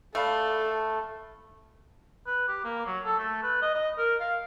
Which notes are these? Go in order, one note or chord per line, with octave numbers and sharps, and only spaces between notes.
A3 A4 D5 F5 B5
B4
G4
A#3
F#3
A4
A3
B4
D#5
D#5
A#4
F5